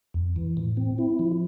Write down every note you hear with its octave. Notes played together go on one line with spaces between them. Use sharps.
F2
E3
A2
C4
E4
F3